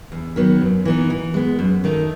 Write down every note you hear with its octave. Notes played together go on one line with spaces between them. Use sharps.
E2
D#3 F#3 B3
F#2
E3 B3 D#4
E3
G#3 B3
F#2
D#3 A3 D#4